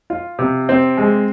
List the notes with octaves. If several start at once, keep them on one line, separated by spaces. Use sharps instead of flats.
F4
C3
C4
G#3